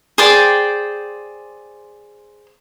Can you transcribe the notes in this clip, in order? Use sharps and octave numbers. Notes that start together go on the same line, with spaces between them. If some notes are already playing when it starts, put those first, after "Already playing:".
G#4 C5 D5 G5